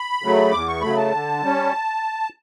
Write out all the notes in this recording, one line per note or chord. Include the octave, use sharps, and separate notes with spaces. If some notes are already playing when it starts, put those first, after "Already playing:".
Already playing: B5
C#3 F#3 A3
E2 D6
C#6
C#3 F#3 A3 B5
A5
D3
G3 C#4